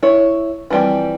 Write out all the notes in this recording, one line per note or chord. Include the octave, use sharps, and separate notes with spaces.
E4 C#5
E3 F3 G3 C4 G4